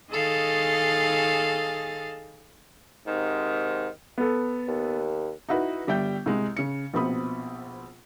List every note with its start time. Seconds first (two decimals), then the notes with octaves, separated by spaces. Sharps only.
0.11 D#3 G#4 A4 D#5 F5 A6
3.07 G#2 C3 D#3
4.18 B3 A4
4.68 D#2
5.49 D#4 E4 F#4 B4
5.87 G1 G3 E5 G5 G6
6.26 C2 G#3
6.57 C#3 C#7
6.94 A#1 B2 C4 B5 D#6